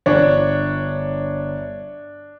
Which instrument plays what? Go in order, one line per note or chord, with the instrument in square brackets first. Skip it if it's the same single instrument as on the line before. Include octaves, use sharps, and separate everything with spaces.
[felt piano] G1 [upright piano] D4 [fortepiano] C#5